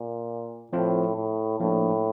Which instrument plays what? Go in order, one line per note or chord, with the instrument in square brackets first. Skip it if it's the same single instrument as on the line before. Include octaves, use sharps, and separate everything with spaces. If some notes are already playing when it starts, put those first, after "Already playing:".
Already playing: [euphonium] A#2
[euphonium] A2 [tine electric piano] F3 C4 F4
[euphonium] A2
[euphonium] A2 [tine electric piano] F3 A#3 D4